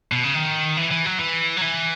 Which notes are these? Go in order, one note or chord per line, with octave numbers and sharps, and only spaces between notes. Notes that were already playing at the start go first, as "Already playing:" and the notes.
B2
C#3
D#3
E3
E3
F#3
E3
F#3
E3